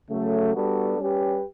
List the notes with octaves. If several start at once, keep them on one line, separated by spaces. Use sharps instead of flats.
C#3 F#3 A3
G3 B3 D4 F#4 A4
G3 C#4 G4 B4